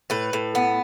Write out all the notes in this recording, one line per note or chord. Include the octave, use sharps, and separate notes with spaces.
A2 B4
A2
B3